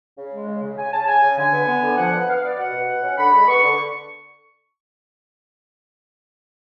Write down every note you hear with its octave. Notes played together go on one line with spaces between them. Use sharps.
C#3
G#3
C#3
C#3
C#3 G#5
C#3 A5
C#3 G#5
C#3
D3 G#5
B3
B3
D3
F3 F#5
B3
B3 F5
B3 D5
B2 F#5
B2
B2
C#4
D3 B5
G#3
B3 C#6
D3